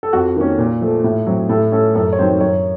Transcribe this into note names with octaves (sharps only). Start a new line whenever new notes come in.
A4
F2 F#4
D#3 A#3 C#4
A#2
F3 A3
A2
F#3 C4
A2 A4
A3 C#4 A4
F#2 A4
C#5
D#3 F#3 C4 C5
F#2 C#5